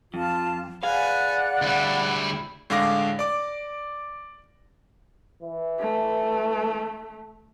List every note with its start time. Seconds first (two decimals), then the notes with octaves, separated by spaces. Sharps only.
0.14 F2 F4 A5
0.83 G#4 B4 D5 F5 F#5 G#5 F#6
1.62 D2 G3 E4
2.70 A2 D3 G#3 F5 D6 A#6
3.19 D5 D6
5.43 E3
5.79 A3